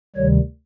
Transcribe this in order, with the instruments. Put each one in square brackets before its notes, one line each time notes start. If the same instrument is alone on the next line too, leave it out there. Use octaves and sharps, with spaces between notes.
[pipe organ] D2 C3 D#3 G3 C#5